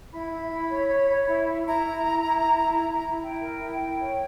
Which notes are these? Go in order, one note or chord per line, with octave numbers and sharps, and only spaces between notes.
E4 B5
E4
E4
C#5
C#5
C#5
E4
E4
E4 A#5
E4
E4
E4
E4
E4
E4
E4
E4 G5
A#4
E4
E4
C#5